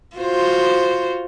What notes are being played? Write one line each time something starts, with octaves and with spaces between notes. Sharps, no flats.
F4 F#4 C5